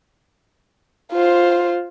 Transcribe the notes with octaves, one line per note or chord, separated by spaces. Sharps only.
F4 C5